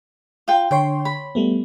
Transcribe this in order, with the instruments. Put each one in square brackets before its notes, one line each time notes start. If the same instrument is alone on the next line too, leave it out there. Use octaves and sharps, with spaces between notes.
[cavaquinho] F4 G5
[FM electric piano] D3 C#5 C6 [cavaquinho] G5
[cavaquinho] B5
[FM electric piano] G3 A3 B3